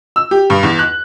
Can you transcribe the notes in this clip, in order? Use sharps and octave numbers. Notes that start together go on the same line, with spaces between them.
E6
G4
G2
E2
F#6